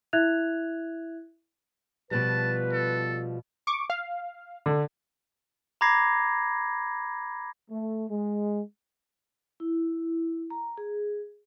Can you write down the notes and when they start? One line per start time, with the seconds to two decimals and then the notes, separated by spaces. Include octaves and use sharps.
0.13 E4 E5 F#6 G#6 F7
2.11 B2 F3 G3 B4 A5
2.72 A4
3.67 C#6 D6
3.90 F5
4.66 D3
5.81 A#5 B5 D6 G#6 A#6 C7
7.70 A3
8.10 G#3
9.60 E4
10.50 A#5
10.78 G#4